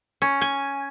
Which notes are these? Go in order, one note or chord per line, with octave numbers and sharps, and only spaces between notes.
C#4
G#5